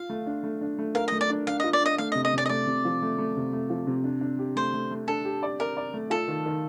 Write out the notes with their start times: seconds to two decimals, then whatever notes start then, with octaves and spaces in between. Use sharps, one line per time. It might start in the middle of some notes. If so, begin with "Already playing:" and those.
Already playing: F4 F5
0.09 A3
0.26 D4
0.43 A3
0.61 D4
0.78 A3
0.95 A#4 F5
1.08 D#5
1.12 A3
1.21 D5
1.30 D4
1.47 D4 F5
1.60 F4 D#5
1.73 D5
1.81 D4 D#5
1.98 A3 F5
2.12 C3 D#5
2.25 D#5
2.33 C3 D5
2.46 D#5
2.49 A3 D5
2.67 C3
2.85 F3
3.02 A3
3.18 A3
3.37 C3
3.53 A3
3.70 F3
3.87 C3
4.04 D4
4.21 D4
4.39 G4
4.56 A3 C5
4.74 A3
4.91 A3
5.08 D4 A4
5.25 G4
5.43 D5
5.60 A#4 D5
5.77 D5
5.94 A3
6.10 F4 A4
6.28 D#3
6.46 D#3